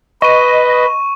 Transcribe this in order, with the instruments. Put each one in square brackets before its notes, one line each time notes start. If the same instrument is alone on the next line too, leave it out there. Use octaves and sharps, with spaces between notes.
[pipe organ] B4 [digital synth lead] D#5 [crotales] C#6 D#7